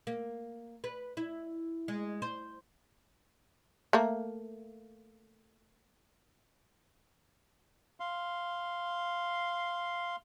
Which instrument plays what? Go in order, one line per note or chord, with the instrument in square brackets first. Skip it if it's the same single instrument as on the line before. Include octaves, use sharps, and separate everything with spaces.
[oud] A#3
B4
E4
G#3
C5
[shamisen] A3 A#3
[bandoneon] F5 C6